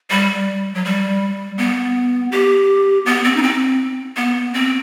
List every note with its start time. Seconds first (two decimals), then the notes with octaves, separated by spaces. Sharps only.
0.11 G3
0.75 F#3
0.85 G3
1.58 B3
2.32 G4
3.06 B3
3.24 C4
3.36 D#4
3.43 C4
4.17 B3
4.54 C4